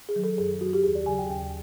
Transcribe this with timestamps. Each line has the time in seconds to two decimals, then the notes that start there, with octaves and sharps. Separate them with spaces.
0.09 G#4
0.16 D#3 F#3
0.24 A4
0.38 F#2 G#4
0.61 D#3 F#3 F#4
0.73 G4
0.84 D#2 G#4
0.95 D5
1.06 C#3 F#3 G#5
1.18 G5
1.30 D#2 G5